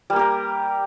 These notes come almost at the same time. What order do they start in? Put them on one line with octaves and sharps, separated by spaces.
G3 A#3 G4 A#4